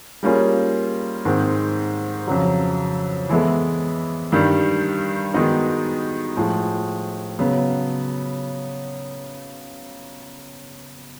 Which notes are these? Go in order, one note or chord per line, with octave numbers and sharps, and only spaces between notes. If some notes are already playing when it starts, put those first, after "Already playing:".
G3 A#3 C#4 F4 G#4
G#2 D#3 G#3 C4
F2 C#3 F#3
E3 G#3 B3 E4 A4
G2 D#3 G3
D#3 G#3 B3 D#4 F#4
A2 F3 G#3
C#3 F#3 B3